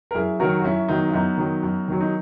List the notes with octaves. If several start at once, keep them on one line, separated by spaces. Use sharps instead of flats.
A#4
F#2 E4 G#4
D#3 F#3 F#4 A#4
F#4
F#2 C#4 E4
D#3 F#3 B3 D#4
E4
F#2 B3 D#4
D#3 F#3
F#2
D#3 F#3
D#4